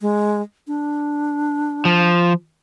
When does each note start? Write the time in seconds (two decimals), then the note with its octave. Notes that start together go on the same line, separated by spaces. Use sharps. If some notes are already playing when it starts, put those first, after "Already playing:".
0.01 G#3
0.67 D4
1.85 F3